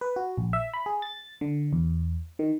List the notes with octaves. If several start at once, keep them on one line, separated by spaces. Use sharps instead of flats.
B4
F#4
A#1
E5
B5
G#4
A6
D3
E2
D#3